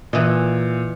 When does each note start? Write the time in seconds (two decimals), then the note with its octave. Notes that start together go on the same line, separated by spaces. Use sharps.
0.13 A#2 E3 D#5